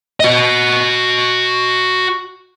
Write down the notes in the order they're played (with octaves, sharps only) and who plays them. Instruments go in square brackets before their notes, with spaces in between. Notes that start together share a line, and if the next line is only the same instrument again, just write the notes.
[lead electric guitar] F#4 D#5